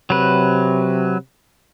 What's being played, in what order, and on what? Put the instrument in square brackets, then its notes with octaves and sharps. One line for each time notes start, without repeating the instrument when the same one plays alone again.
[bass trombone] C3 [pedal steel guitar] F#3 B4